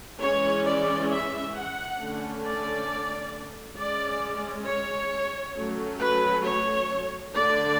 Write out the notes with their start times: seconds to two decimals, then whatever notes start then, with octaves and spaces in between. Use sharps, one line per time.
0.20 E3 G#3 C#4 C#5
0.64 D5
1.10 E5
1.54 F#5
1.98 D3 A3 C#4
2.42 D5
3.76 G#3 C#4 D5
4.66 C#5
5.55 F#3 A3 C#4
5.99 B4
6.44 C#5
7.33 D3 A3 D4 D5